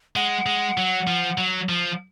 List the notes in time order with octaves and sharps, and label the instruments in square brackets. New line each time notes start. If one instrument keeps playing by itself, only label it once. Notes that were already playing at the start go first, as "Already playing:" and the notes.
[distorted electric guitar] G#3 [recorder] F#5
[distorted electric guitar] G#3
F#3
F3
F#3
F3